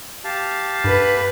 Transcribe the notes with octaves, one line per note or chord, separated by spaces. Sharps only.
G4 F5 A5
G2 B4